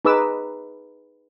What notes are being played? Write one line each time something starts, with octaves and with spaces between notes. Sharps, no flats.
D#4 G#4 B4 D6 E6